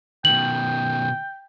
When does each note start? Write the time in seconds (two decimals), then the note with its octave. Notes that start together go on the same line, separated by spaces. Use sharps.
0.25 B2 D#3 G5 F#7